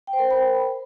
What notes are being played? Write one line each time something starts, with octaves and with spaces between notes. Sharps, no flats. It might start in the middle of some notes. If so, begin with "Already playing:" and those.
G5
C5
A#4
C5
B5